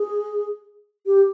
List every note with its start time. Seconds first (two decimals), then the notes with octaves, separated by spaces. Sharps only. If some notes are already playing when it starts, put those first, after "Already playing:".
Already playing: G#4
1.06 G4